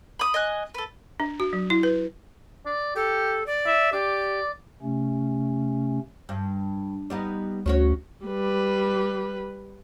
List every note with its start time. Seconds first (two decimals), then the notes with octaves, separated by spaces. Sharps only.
0.19 B5 D#6
0.34 D#5 G#5 F#6
0.74 A4 B4
1.20 D4
1.40 F#4
1.53 F#3
1.70 E4
1.83 B4
2.66 D5
2.95 G4 A4
3.46 D5
3.66 E5
3.92 G4 D5
4.82 C3 A3 C#4
6.29 G2
7.10 G3 B3 D#4
7.66 D2 C#4 F#4 C#5
8.25 G3 B4